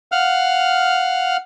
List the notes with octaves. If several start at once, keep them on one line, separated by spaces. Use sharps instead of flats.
F5 F#5 F6